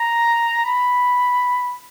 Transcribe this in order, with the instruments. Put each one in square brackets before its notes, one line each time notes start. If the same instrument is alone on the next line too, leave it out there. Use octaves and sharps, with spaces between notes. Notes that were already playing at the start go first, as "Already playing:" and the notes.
Already playing: [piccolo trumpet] A#5
B5